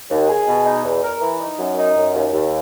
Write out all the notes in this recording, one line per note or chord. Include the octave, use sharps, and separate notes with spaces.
D#2
G#4
B2
D#4
E2
A#4
E3
D#4
F#2
D#4
F#2
D#2
D#2